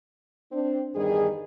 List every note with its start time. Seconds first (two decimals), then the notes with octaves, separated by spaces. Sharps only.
0.52 C4 D4
0.95 E2 G2 D#3 G3 G#4